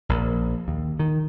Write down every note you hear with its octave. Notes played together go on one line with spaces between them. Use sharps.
A#1
D#2
D#3